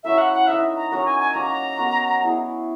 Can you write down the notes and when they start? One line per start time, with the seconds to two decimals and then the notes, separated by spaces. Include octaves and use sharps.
0.03 F#3 C#4 E4 A#4 E5
0.18 F#5
0.33 F#5
0.47 D#4 A#4 D#5 E5
0.76 A#5
0.91 F#3 C#4 F#4 A#4 A#5
1.05 G#5
1.20 G#5
1.34 F#3 A#3 C#4 A#5
1.78 B3 F#4 A#4
2.22 B3 E4 G#4